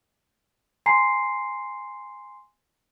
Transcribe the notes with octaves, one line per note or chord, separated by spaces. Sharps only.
G#5 A#5 C6 C7